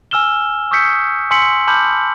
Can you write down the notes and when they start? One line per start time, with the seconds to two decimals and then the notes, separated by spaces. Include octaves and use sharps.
0.11 G#5 E6 F6 E7 G7
0.71 C#6 D#6 E6 G6 B6 C#7
1.31 G#5 C6 E6 B6 C#7 F#7
1.67 A5 B5 D6 F6 G6 F#7